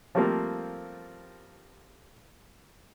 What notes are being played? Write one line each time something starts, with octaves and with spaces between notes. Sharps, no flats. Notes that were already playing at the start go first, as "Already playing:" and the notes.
F3 G3 A3 A#3 C4 F4